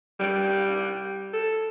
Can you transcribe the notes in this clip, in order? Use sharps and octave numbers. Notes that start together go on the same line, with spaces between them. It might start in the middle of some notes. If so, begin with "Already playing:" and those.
G3
A4